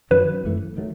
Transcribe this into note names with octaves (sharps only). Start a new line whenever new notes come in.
F#2 D#3 F#3 C#4 B4
G#1 F#2 E3 A3
D#3 F#3 A3